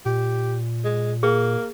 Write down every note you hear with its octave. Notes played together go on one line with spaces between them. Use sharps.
A#2 G4
G#3
A#3 G#4